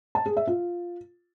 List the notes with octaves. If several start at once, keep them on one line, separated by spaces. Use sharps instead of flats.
A5
G#4
E5
F4